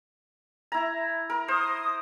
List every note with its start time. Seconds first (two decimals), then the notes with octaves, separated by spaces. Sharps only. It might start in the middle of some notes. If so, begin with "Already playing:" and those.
0.72 E4 A#5
1.30 A#4
1.48 C5 D#6